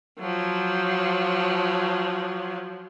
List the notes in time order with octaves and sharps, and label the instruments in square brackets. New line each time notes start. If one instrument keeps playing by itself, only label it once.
[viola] F3 F#3